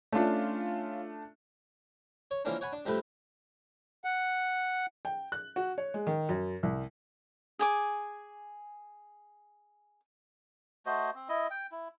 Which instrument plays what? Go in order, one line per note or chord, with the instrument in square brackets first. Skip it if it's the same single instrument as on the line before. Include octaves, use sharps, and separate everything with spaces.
[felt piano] A3 D4 [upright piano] C#4 F4
[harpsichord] C#5
E3 F3 A#3 C#4 D4
C#5 F#5 G#5 B5
D4
G2 F3 A3 G4 B4
[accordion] F#5
[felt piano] G5
F#6
F#4
C#5
G#3
D#3
F#2
C2
[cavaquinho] G#4 G#5 D6
[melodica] A3 F#4 C5 D#5
C4
E4 D#5
G5
E4